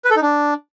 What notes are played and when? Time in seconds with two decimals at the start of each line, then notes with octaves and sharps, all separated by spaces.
0.05 B4
0.11 A4
0.16 D#4
0.22 D4